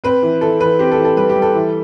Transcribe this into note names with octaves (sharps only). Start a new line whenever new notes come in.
C4 B4
E3
E3 A4
E3 B4
C4 G4
A4
E3
A4
G3 B4
G4
G3
A4
E3